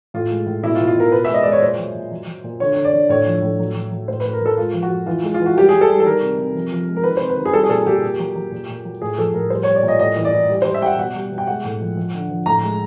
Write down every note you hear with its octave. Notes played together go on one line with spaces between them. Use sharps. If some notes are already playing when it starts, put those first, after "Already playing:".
A2 F4
G#3
A2
B2 E4
F4
B2
F4
B2 A#4
B2 B4
E5
G#3
D#5
G#3 D5
C#5
A#2 C5
F#3
A#2
F#3
F#3
A#2
D3 C#5
D3
D5
D3
A2 C#5
F3
A2
F#3
F#3
F#3
A2 C5
B4
A2
A#4
A2 A4
G#3 F4
F3
F#4
F3
E3 F4
G#3
F4
E3
F#4
G3 G4
G3 G#4
A4
G3
A4
D#3 A#4
C3
C3
F3
F3
G#3
A#4
D#3 B4
C3 C5
B4
D#3
G#4
G3 A4
G#4
A#2 A4
A#2 G4
A#2
F#3
F#3
A#2
A#2
F#3
A2 G#4
F3 A4
A2 A#4
G3 C5
G3 C#5
D5
A#2
D#5
A2 D#5
E3
D5
E3
G3
G3 C5
E5
G3 F#5 G5
B2 F#5
G3
B2
G5
G#3 F#5
A2
F3
F3
D3
F3
A2 A#5
G#3